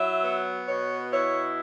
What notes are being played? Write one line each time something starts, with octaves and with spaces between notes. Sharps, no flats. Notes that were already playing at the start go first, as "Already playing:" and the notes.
Already playing: F#3 E4 E5
B3
B2 C#5
E4 C#5